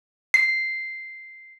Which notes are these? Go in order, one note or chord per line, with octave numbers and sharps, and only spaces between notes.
C7